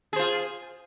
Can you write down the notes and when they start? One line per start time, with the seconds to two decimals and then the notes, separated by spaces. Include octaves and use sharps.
0.13 G#4
0.16 C5
0.19 F4